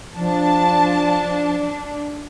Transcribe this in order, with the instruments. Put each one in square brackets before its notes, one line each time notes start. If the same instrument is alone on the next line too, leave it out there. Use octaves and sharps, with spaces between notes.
[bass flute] F3 [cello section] D4 [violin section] A5